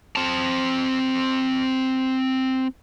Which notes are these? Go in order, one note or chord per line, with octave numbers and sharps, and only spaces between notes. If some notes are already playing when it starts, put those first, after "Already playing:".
C4 A5